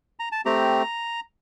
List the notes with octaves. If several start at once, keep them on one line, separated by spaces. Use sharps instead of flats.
A#5
A5
A3 C4 G4 A#5